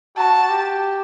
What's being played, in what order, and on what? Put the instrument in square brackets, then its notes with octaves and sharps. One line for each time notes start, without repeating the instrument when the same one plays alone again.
[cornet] F#4 [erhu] A5
[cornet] G4